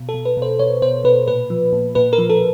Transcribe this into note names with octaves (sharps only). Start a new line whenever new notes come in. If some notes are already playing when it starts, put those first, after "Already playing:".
Already playing: B2
A4
B2
B4
B2
C5
B2 C#5
B2 C5
B2 B4
A#2 B4
F3
A#2
A#2 B4
A#4
F3
A4